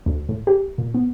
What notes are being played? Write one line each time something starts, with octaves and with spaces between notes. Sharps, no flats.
D2
A2
G4
A#2
B3